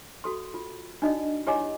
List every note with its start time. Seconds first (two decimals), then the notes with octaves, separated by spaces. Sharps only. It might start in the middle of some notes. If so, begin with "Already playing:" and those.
0.24 F#4 A4 C6
0.54 F4
1.02 D4 D#4 F#4 D5 D#5
1.47 E4 G4 C#5 D#5 G#5 D6